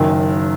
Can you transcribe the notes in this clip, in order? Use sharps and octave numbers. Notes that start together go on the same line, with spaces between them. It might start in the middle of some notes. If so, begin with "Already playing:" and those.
Already playing: F#1 F#2 D#3